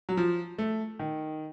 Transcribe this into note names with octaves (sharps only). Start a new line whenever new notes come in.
F#3
F3
A3
D#3